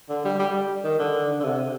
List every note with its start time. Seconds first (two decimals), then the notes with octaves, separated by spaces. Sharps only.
0.09 D3
0.25 G3
0.39 G3
0.84 D#3
0.99 D3
1.40 D3
1.44 C3